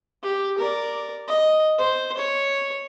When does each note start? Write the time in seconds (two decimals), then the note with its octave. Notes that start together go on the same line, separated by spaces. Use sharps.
0.23 G4
0.58 A#4 D5
1.27 D#5
1.78 C5
2.17 C#5